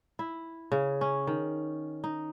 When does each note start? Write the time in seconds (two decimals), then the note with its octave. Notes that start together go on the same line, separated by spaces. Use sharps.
0.19 E4
0.72 C#3
1.01 C#4
1.27 D#3
2.04 D#4